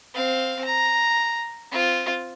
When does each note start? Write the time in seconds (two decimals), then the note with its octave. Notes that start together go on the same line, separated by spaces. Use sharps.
0.14 C4 F5
0.65 A#5
1.72 C4 F4